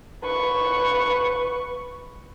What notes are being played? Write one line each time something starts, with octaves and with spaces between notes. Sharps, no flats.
B4 C#6